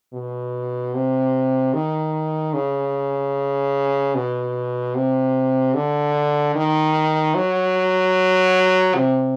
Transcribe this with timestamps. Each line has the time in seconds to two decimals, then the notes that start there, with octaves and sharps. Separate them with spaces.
0.14 B2
0.95 C3
1.74 D#3
2.54 C#3
4.15 B2
4.95 C3
5.75 D3
6.55 D#3
7.35 F#3
8.95 C3